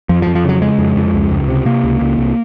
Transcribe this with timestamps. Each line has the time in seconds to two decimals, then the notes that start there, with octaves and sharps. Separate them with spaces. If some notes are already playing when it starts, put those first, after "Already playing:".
0.09 F2 F3
0.22 F3
0.27 F2
0.35 F3
0.44 C#3 F#3
0.62 C#3 G#3
0.78 F2
0.97 F2
1.14 C#2
1.31 C#2
1.48 C3
1.65 C3 A#3
1.84 C#2
2.01 C#2
2.18 C2